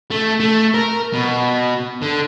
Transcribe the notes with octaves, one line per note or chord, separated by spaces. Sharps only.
A3
A3
A#4
B2
D3